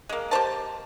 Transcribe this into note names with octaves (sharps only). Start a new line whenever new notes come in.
G#3 A#3
G4 A#4 C5 A5